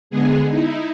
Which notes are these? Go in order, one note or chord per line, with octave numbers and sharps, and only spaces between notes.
D3 G#3 B3 G#4
D#4 E4